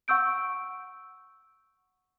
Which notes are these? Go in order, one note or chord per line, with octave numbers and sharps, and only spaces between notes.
F#5 C#6 E6 G6 D7